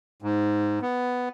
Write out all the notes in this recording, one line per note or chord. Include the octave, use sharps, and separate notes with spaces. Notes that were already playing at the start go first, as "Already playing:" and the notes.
G#2
B3